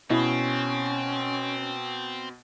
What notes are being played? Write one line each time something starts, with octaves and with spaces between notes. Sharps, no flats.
B2 C4 C#4 E4 D#5